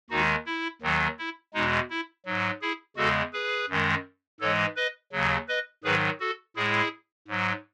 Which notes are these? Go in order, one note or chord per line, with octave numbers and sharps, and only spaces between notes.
D#2 D#3 G#3 D#4 F#4
E4
D#2 D#3 F#3
E4
E2 B2 G#3 D#4
E4
G#2 F#3
E4 G#4
E2 C#3 G#3 F#4 A4
G#4 B4
F#2 D#3 G#3
G#2 E3 G#3 A4 C#5
B4 D#5
D#2 C#3 F#3
B4 D#5
G#2 D#3 F#3 G#4 B4
F#4 A4
A2 G#3 E4 G#4
G#2 F#3